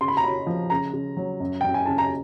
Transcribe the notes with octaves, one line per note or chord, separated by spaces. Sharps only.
C#3 C6
B5
A#5
C#4 B5
F3
C#3 A#5
C#3
F#3
F#2
F#2 G5
G#5
C#3 A5
A#5